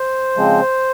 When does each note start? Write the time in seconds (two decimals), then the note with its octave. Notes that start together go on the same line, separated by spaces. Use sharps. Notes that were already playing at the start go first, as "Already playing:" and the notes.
Already playing: C5
0.36 C#3 F3 G#3 C4